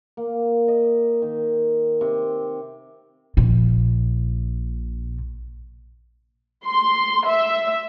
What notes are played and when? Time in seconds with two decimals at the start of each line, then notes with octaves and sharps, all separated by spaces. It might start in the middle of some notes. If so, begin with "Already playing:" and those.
0.17 A#3
0.68 D#5
1.22 D#3
2.01 C3
3.37 A#1 A#2
6.65 C6
7.26 E5